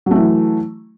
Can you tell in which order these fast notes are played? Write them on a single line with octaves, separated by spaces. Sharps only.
F#3 A3 E3